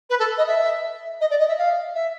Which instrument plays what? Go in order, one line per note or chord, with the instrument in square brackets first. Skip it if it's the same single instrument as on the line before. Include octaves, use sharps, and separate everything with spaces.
[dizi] B4
A4
D#5
E5
D#5
D5
D#5
E5
F5
E5